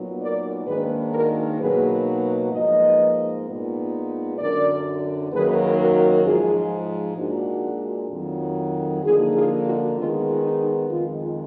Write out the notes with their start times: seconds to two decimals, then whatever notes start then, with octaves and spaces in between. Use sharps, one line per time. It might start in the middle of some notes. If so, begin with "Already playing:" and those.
Already playing: A#2 F#3 B3 D#4
0.20 A#4 D5
0.67 G#2 D#3 A#3 D4 G#4 B4
1.13 F#4 A#4
1.60 B2 F#3 A#3 D#4 G#4 B4
2.52 G#2 F3 A#3 B4 D#5
3.46 A#2 G#3 B3 D#4
4.39 F#2 D3 F#3 A#4 D5
5.31 F#2 D#3 F#3 A#3 D#4 G#4 B4
5.78 F#4 A#4
6.24 G#2 F3 G#3 F4 G#4
7.17 A#2 G#3 D4 D#4 F#4
8.10 F2 D#3 F#3
9.03 D3 F3 A#3 D#4 F4 G#4
9.34 F4 G#4
9.65 D#4 F#4
9.96 D#3 G#3 B3 F4
10.43 D#4
10.89 F2 D#3 G#3 F4